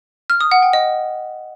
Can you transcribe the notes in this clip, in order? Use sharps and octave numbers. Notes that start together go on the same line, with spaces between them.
F6
D#6
F#5
G5
D#5